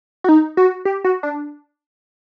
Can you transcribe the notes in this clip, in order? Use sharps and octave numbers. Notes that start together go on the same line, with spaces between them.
F#4
D#4
F#4
G4
F#4
D4